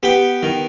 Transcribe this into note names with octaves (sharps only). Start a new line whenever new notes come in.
B3 G4
D#3